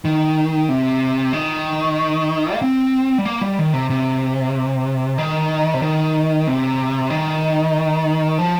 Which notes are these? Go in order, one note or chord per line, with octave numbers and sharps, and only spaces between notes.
D#3
C3
D#3
A#3
C4
G3
A#3
G3
D#3
C3
C3
D#3
C3
D#3
C3
D#3
F3